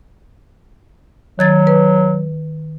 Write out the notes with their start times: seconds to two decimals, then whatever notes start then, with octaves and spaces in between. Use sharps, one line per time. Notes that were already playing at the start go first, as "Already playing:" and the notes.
1.39 D#3 F#3 G#6 A6
1.67 B4